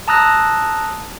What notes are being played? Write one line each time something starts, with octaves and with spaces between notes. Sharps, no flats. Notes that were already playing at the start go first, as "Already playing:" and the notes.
A5 A#5 D#6 E6 F#6 A#6